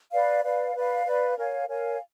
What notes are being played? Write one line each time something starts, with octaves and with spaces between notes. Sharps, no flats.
B4 D5 F5
B4 D5 F5
B4 D5 F5
B4 D5 F5
A#4 C#5 F5 G#5
A#4 C#5 F5 G#5